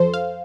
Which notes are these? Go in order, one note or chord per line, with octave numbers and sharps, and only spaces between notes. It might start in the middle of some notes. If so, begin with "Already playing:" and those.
Already playing: F2 F3 A4 C5
F5